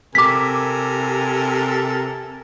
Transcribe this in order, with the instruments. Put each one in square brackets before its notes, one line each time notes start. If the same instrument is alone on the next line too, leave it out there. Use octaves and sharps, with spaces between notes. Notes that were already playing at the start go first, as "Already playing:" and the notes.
[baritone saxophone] C3 [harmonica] A4 A#4 G#5 [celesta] D6 B6